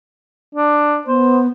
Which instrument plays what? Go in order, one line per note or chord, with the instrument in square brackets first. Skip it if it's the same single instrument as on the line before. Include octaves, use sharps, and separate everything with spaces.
[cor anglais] D4
[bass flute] B3 [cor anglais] C5